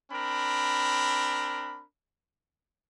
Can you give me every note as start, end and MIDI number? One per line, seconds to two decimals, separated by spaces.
0.11 1.84 60
0.11 1.84 62
0.11 1.84 70
0.11 1.84 83